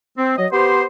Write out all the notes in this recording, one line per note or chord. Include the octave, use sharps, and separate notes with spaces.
C4
F#3 D#5
B3 G4 C5